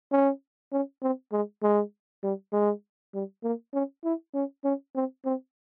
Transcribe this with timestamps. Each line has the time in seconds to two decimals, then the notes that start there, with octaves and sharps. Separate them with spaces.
0.12 C#4
0.72 C#4
1.02 C4
1.32 G#3
1.63 G#3
2.23 G3
2.53 G#3
3.14 G3
3.44 A#3
3.74 C#4
4.04 E4
4.34 C#4
4.64 C#4
4.95 C4
5.25 C4